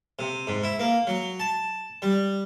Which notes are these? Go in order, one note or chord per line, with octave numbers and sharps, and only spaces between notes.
C3
G#2
E4
A#3
F#3
A5
G3